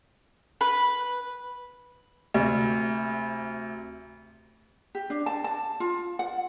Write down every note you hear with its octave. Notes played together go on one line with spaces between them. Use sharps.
B4
D2 C3
G4
D4
A5
A5
F4
F#5